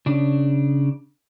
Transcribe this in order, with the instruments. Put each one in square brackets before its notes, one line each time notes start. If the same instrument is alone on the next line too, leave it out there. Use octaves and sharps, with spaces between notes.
[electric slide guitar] C#3 D4